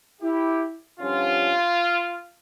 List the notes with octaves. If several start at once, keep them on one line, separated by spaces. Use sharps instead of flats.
E4 G4
G2 D3 F3 C#4 F4